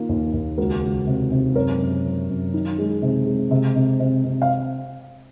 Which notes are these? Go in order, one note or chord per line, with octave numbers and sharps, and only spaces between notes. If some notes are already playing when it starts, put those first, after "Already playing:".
Already playing: D#3 A#3 F4
D#2
D#2
C#2 F#4 A#4
C#2
C3
C3
F#2 A#4 C#5
F#2
F#2
F#2
D#3
G#3
C3
G#3
C3
C3
C3
C3
F5